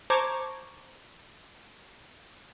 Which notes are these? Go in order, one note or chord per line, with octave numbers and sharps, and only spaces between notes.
C5 A5 A#5 C#6 D6 G#6